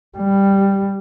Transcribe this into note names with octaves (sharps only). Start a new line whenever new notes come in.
G3